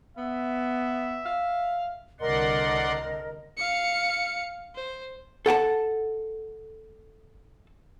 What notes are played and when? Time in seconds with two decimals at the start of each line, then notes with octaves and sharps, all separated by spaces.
0.17 B3 E5
1.25 F5
2.20 C2 D3 A#4 D5 D#5 F#5 C6
3.58 F5 C#7
4.76 C5
5.46 A4 F#5 G5 A5